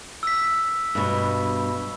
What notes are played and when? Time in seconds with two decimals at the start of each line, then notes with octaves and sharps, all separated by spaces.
0.23 E6 B6
0.95 G2 B2